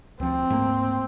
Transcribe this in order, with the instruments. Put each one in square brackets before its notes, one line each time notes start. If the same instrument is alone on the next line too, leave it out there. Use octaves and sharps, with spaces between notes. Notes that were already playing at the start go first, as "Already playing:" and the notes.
[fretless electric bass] D2 F3 [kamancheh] C4
[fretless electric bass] G#2 A3 A#3